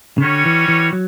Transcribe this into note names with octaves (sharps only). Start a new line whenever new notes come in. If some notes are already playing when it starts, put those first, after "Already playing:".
C#3
D3 G3 C#4 F#4 C#5
E3
E3
F#3